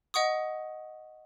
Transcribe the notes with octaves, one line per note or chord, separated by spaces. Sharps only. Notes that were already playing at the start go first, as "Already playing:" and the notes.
D#5 F#5 C#6 D#6